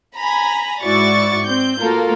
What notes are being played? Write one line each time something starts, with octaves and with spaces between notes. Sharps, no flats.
G#5 A#5 B5
G#2 E4 F#4 D5 C#6 A6
C4 G6
A#3 F4 F#4 A4 A#4